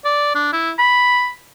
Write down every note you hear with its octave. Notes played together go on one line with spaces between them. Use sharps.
D5
D4
E4
B5